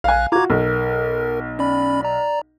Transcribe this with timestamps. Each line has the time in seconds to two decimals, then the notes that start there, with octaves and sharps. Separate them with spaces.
0.04 A#1 F5 G#5 F#6
0.32 F4 F#4 A#5 D6 G#6
0.50 B1 A#4
1.59 C#4 D5 B5
2.04 D5 A#5